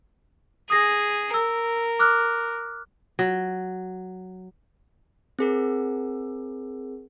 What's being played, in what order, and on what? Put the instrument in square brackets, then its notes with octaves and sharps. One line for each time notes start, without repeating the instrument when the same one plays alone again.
[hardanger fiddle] G#4 [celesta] D#6 A#6
[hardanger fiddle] A#4 [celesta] E6
[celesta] D6 F6 F#6
[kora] F#3
[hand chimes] C4 G#4 A#4